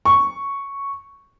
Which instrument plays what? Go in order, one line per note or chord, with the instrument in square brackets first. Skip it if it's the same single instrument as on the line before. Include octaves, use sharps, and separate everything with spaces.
[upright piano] C#6